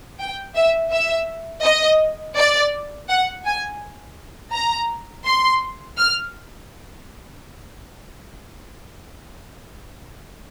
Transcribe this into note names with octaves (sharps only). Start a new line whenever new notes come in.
G5
E5
E5
D#5
D5
F#5
G#5
A#5
C6
F6